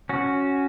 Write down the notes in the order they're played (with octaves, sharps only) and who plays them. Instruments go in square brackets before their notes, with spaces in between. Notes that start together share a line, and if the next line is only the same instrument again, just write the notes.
[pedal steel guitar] C#4 F#4